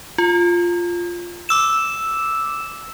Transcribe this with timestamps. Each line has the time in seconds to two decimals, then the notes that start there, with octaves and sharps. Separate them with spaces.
0.18 F4
1.49 D6 E6 E7